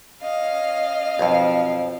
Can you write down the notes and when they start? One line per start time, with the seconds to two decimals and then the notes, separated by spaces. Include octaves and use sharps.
0.22 C#4 D#5 F5
1.19 B1 F2 F3 C4